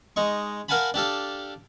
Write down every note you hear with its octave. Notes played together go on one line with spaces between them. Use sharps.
G#3 D#4 C#6
A#4 F5 F#5 G#5 A5 B5
D4 G4 A4 F5